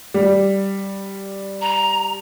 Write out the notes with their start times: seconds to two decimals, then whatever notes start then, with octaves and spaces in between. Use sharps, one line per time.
0.14 G3
1.61 A#5